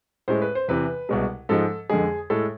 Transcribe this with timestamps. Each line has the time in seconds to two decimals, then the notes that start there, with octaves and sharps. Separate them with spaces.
0.28 A2 G#3 C5
0.42 B4
0.55 C5
0.68 E2 C3 E3 B4
1.09 C2 B2 G#3
1.49 G#2 F3 G#3 A4
1.89 F2 D3 G#3 G#4
2.30 A2 G#3 A4